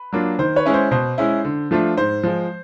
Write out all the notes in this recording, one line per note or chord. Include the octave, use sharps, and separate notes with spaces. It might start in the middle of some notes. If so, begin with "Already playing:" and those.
Already playing: B4
F#3 A#3 D4 F4
D#3 C5
B4 C#5
G#3 C#4 E4
C5
B2 C5
G#3 C#4 E4
D3
F3 A3 D4 F4
G#2 C5
F3 G#3